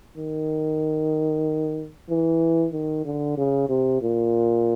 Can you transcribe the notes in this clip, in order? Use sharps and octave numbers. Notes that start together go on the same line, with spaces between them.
D#3
E3
D#3
D3
C#3
C3
A#2